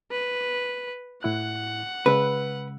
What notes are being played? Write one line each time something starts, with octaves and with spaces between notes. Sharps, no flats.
B4
A2 E4 F#5 F#6
C#3 G#3 B4 E6